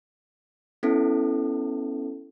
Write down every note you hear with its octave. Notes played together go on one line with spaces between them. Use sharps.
B3 C#4 E4 A4